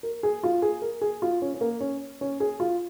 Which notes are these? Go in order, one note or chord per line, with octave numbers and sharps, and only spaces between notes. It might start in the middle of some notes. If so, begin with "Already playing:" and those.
A#4
G#4
F4
G#4
A#4
G#4
F4
C#4
C#4
A#3
C#4
C#4
G#4
F4